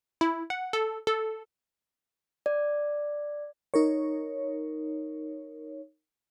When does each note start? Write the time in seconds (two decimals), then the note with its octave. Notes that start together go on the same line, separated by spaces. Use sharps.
0.21 E4
0.50 F#5
0.73 A4
1.07 A4
2.46 D5
3.74 D#4 A#4 C#5